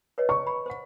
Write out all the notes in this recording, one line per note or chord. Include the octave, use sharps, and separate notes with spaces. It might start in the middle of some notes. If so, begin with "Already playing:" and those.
B4 C#5 D#5
C#6
B5
C5 F#5